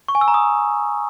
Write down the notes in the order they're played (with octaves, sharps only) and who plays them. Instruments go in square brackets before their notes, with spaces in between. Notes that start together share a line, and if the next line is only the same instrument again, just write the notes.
[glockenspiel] C#6
G#5
E6
A#5
D#6